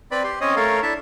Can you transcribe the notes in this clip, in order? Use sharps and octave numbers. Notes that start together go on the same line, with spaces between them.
C4 B4 D5 B5
G4 C6
C4 C#4 C#5 D#5 D#6
A3 A4 A#4 C#5 F5
D4 E4 A4 E5 A5